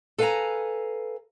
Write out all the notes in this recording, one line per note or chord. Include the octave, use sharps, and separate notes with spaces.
A4 B4 F5 G5 G#5 A#5